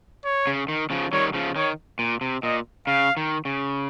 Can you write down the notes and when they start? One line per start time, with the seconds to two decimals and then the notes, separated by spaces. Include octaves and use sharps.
0.25 C#5
0.47 C#3
0.68 D#3
0.90 C#3 F3
1.12 D#3 G3 C#5
1.34 C#3 F3
1.56 D#3 C#5
1.99 A#2
2.21 C3
2.43 A#2 D#5
2.87 C#3 F5
3.17 D#3
3.45 C#3